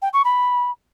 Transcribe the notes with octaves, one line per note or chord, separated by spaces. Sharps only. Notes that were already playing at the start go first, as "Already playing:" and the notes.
G5
C#6
B5